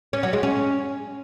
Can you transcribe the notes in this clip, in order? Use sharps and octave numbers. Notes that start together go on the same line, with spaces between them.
C#4
F#3
G#3
C#4